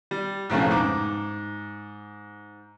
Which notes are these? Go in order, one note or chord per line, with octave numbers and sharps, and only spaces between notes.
G3
B1 F2 A2 C#3
G#2 D6